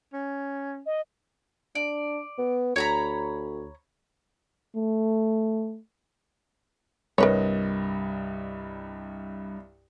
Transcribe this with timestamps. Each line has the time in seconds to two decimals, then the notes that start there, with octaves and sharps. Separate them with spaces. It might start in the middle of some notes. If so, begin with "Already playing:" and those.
0.13 C#4
0.86 D#5
1.75 D4 D5
2.38 B3
2.76 D2 C#5 A#5 B5
4.76 A3
7.18 C2 G2 A#4 B4 C#5 D#5